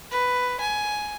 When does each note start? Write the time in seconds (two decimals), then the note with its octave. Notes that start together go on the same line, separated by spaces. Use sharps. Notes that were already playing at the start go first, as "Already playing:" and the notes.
0.11 B4
0.60 G#5